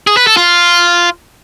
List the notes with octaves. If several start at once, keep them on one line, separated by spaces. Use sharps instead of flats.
G#4
B4
A4
F4